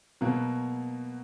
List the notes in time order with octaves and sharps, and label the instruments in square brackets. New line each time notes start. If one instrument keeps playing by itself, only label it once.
[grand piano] B2 F#3 A#3